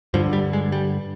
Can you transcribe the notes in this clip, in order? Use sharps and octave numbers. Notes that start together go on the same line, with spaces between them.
G2 D3 F3
G3
G#3
G3